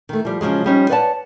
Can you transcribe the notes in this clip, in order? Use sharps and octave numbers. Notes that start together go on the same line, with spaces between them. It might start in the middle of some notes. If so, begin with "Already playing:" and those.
D#3 A3
F3 G3
C#3 F3 F#3 G#3
F3 G3 C#4 D#4
B4 C#5 D5 F#5 G5 A5